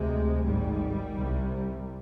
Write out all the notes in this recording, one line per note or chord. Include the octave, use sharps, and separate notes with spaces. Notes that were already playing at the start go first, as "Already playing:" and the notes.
Already playing: D2 C3 G#3
G#1 G#2 G3
C2 C3